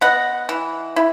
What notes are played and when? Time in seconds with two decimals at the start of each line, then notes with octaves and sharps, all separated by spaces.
0.01 B3 D#5 F#5
0.49 E3
0.96 E4